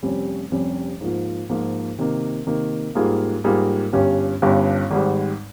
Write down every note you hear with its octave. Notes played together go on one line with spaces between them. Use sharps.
F1 F2 C3 G3 C#4
F1 F2 C3 G3 C#4
G#2 F3 A#3 F4
G#2 F3 A#3 F4
C3 D#3 A#3
C3 D#3 A#3
G#2 G3 A#3 F4 G#4
G#2 G3 A#3 F4 G#4
G1 G2 G3 C#4 G4
G1 G2 G3 C#4 G4
G#1 G#2 G3